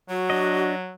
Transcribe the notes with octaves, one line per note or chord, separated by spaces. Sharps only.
F#3 F#4
D4 D#5